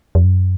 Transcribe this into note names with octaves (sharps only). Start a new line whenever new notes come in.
F2
F#2